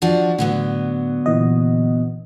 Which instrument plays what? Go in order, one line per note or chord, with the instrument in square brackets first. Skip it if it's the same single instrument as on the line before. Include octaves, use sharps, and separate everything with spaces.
[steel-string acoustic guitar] F3 D4 F#4
[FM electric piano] A2 [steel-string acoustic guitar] D3 F#3 B3
[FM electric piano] A#2 E3 D#5